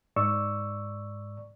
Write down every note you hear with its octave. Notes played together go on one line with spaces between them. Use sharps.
G#2 D5 C#6 E6